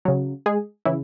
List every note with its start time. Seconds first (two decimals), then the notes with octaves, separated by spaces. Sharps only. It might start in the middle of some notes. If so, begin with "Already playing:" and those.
0.05 C#3 F#3
0.46 G#3 G#4
0.85 C#3 E3 E4